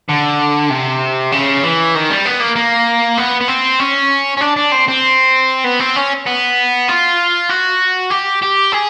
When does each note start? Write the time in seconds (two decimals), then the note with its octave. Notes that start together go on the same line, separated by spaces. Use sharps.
0.09 D3
0.70 C3
1.32 C#3
1.63 E3
1.95 D#3
2.10 G3
2.25 B3
2.40 A#3
2.56 A#3
3.18 B3
3.41 B3
3.48 C4
3.80 C#4
4.37 C#4
4.41 D4
4.56 D4
4.72 C4
4.88 C4
5.64 B3
5.80 C4
5.96 C#4
6.26 B3
6.88 F4
7.50 F#4
8.11 G4
8.43 G4
8.73 G#4